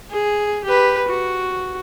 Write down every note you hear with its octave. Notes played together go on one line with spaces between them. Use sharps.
G#4
G4 B4
F#4